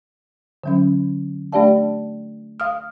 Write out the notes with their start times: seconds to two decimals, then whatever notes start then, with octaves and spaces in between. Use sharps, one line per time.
0.64 D3 F#3 C#4
1.52 A3 D4 G4 D5 F5 A5
2.60 F5 D#6 F6